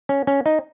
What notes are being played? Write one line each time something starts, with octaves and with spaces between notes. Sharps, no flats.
C#4
C#4
D#4